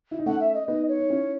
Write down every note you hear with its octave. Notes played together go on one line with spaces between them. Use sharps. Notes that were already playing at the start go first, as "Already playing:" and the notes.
E4
D#4
A3 C#4 F#5
E5
D#5
B3 D#4 D#5
C#5
D#4
C#4 E4